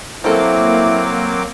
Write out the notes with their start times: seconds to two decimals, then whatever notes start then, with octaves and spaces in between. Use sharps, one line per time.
0.24 F#3 A#3 C4 E4 A4 C5 D6